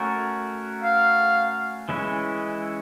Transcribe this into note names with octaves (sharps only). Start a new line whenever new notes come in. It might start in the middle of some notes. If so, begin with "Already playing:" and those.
Already playing: A3 C#4 F#4 A#4
F5
E3 G#3 C#4 E4